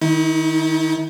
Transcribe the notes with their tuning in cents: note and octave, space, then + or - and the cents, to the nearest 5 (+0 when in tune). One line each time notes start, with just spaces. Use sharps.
D#3 +0 E4 -40